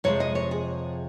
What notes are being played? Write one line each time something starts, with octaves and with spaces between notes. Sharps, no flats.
F2 C3 F3 G#3 C#5
D#5
C#5
G#4